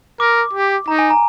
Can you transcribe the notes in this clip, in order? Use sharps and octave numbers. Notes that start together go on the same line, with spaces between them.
A#4 D6
G4
D#4 A#5
G#5
A#5